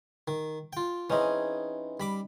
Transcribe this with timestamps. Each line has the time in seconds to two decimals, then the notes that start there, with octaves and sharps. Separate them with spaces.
0.28 D#3
0.73 F4 G5
1.10 E3 C4 C#4 D#4 G#4
2.00 G3 B5 D6